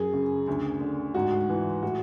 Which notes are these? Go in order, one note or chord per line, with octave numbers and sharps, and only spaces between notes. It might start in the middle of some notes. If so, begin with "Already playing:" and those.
Already playing: F#2 G#4
C#3
D2
D3
G#2 F#4
E3
A2 F#4